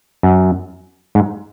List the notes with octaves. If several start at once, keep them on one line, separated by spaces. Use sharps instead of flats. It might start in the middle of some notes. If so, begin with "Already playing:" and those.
F#2
G#2